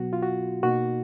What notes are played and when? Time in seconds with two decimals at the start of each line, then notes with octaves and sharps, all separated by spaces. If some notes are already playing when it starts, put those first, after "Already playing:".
Already playing: B2 F#3 B3 F#4
0.13 F4
0.23 F#4
0.63 B2 A#3 D#4 F#4